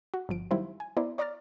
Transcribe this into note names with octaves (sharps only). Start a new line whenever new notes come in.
F#4
G1 G2 F3 D7
D#3 F#3 G3 E4 F4 C5
G#5
B3 E4 A#4 C5 D5
C#5 D5 A#5 D6 F6 A6